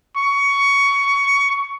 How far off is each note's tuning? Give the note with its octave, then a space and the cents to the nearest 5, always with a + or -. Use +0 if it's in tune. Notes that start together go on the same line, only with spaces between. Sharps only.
C#6 +15